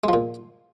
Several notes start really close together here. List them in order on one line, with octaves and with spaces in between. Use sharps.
G#3 F3 A#2